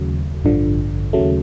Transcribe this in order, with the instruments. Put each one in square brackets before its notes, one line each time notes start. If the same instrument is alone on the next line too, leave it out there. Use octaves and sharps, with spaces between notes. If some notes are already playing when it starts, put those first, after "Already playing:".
Already playing: [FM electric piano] D#2 C#3 F#3 A3
A1 G2 D3 F3
D#2 C#3 F#3 A3